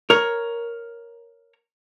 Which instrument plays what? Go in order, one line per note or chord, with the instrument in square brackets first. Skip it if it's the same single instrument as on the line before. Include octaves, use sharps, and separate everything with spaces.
[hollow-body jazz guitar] A#4 C#5